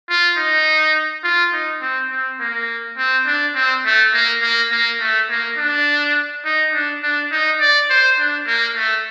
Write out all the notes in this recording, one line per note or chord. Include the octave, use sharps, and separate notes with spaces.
F4
D#4
F4
D#4
C4
C4
A#3
C4
D4
C4
A3
A#3
A#3
A#3
A3
A#3
D4
D#4
D4
D4
D#4
D5
C5
D4
A#3
A3